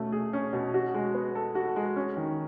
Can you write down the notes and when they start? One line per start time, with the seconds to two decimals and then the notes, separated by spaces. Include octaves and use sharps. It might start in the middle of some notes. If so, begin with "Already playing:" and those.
Already playing: B2 A3 C#4
0.12 G#4
0.33 C#4
0.53 B2
0.74 F#4
0.94 G#3
1.14 B3
1.35 A4
1.55 F#4
1.76 G#3
1.96 C#4
2.17 D#3